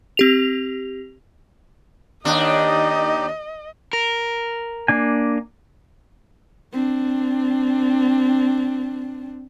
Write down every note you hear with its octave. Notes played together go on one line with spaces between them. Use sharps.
C4 G4 F7
D#2 D4 D#4 G4 D#5
A#4
A#3 D4 G#5
C4 D4